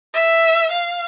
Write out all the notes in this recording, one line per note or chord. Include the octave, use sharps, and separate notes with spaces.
E5
F5